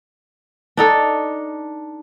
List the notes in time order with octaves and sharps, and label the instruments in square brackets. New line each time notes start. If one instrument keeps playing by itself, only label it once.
[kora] D4 D#4 A4